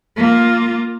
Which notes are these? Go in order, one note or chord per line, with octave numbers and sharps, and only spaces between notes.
A#3 F4